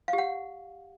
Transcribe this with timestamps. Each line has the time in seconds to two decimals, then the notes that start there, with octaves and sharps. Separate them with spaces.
0.08 F5
0.13 G4
0.18 F#5